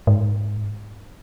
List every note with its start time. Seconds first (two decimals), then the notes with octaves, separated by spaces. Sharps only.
0.07 G#2